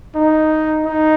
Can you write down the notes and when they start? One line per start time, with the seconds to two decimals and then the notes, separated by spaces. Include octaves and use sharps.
0.15 D#4
0.86 D#4